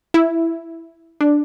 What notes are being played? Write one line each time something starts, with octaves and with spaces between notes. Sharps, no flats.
E4
D4